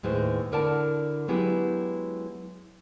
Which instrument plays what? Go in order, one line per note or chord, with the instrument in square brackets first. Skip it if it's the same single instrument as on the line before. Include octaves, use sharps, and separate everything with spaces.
[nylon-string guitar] D#2 A2 G#3 B4 C5
D3 E4 A#4 D5 F#5 A5
F#3 G#3 B3 E4 G4